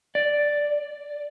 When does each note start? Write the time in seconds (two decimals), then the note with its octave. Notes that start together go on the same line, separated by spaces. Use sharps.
0.15 D5